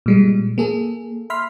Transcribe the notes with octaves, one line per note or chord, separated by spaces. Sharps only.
A#2 G3 G#3
A#3 G#4 A4
E5 B5 C6 F6 B6